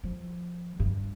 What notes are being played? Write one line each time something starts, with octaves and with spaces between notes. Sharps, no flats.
F3
G2